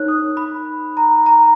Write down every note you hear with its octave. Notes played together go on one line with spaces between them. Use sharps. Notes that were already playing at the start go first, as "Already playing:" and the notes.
Already playing: D#4 A#4 C#5 F#6
D#6
B5
A#5
A#5